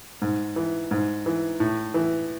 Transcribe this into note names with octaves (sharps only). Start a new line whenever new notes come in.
G#2
E3
G#2
E3
A2
E3